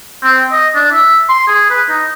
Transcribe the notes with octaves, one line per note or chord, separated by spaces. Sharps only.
C4
D#5
D4
E5
C6
G#4
B4
D#4